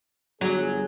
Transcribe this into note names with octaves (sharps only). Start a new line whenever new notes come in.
G1 F#3 G#4